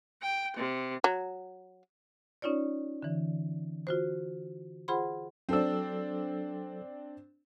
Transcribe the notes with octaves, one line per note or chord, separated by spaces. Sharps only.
G5
C3
F#3
C#4 D#4 F4 C#5 D5
D3 E3
F4 F#4 C5
F4 G#4 C5 F#5 B5 C6
F#3 C4 D4 A4 E6